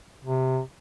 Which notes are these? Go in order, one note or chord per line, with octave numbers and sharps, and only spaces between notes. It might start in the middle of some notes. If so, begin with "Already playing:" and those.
C3